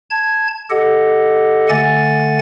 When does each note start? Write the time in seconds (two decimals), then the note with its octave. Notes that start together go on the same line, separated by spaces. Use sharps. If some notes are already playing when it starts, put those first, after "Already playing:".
0.10 A5 G#6
0.70 G4 A4 D#5 F#5
1.69 D3 A3 F#5 G#5 A6